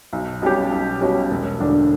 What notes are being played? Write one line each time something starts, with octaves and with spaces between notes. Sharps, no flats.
B1
B2 G3 C#4 G4
B1
B2 G3 C#4 G4
E1
E2 D3 A3 D4